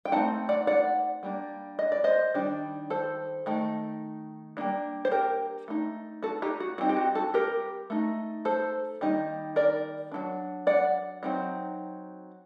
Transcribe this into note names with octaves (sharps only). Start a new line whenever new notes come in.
G5
A3 C4 D#4 F#5 A5
D5 F#5
D5 F#5
G3 A#3 D4
D#5
D5
C5 D#5
D#3 G3 D4
A4 C5
D#3 A3 D#4
G3 A#3 D4
C5
G4 A#4
A3 D#4
F#4 A4
D#4 G4
F#4
G3 C4 D#4 F#4
G4
F#4
F#4 A4
G4 A#4
A3 D#4
A4 C5
D#3 G3 A#3 D#4
A#4 D5
F#3 A3 D4
D5 F#5
F#3 C4 D#4